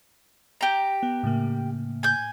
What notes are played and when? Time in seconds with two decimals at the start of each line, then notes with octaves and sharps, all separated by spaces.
0.61 G4 A#5
1.03 B3
1.23 A2 C#3 A#3
2.03 G#5 G6